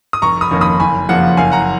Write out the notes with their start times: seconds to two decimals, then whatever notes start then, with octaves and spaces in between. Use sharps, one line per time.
0.13 D#6
0.22 F1 A#5 C#6
0.41 B5 D#6
0.51 F2 D#3 A#3 C#4
0.61 B5 D#6
0.80 F#1 G#5 B5
1.09 F2 C#3 F3 A#3 F#5
1.37 F#1 F5 G#5
1.52 F#5 A#5